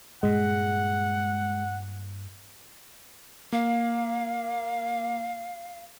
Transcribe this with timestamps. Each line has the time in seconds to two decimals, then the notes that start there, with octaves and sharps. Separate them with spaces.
0.23 G2 A#2 G#3 F#5
3.52 A#3 F5